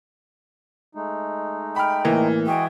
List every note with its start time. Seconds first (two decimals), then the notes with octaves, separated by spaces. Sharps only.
0.95 G#3 A3 D#4
1.76 G5 B5 F6
2.05 A2 E3 A#3
2.47 G#3 F#4 G#4 G5